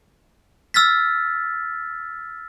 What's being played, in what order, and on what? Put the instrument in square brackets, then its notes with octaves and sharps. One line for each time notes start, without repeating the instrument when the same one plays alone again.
[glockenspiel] E6 F6 A6 B6